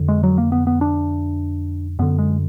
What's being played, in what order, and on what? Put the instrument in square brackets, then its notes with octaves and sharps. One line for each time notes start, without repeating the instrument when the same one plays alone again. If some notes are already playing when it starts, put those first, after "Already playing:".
Already playing: [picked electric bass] F2 D3
G#3
F#3
A#3
B3
B3
D4
F#2 D3 B3
G#3